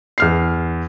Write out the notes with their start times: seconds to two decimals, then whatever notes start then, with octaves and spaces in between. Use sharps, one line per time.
0.18 E2 F6 C7